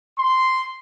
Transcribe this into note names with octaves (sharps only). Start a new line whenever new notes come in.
C6